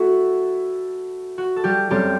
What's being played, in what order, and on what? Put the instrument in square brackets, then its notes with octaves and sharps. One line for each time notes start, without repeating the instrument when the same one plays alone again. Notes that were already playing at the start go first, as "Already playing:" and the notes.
Already playing: [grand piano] A3 E4 A4 E5 [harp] F#4
[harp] F#4
A4
G3 G4
[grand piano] F#2 F#3 A3 C4 [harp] G3 G4